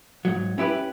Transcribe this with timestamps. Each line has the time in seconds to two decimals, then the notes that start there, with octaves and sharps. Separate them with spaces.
0.25 G#2 F#3
0.58 C#4 E4 G4 B4